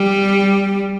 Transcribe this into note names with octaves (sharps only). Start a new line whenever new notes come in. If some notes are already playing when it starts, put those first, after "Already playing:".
Already playing: G3